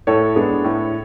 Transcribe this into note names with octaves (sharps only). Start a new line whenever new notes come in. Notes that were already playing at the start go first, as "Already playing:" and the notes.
A2 A4 C#5
G#3 B3 D4
A2